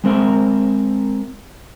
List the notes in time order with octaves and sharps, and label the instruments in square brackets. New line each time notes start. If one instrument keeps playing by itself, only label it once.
[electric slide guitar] G#3 C4 A#4 E5